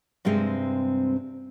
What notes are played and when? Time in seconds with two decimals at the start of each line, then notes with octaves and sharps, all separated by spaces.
0.25 G2 C3 G#3 C4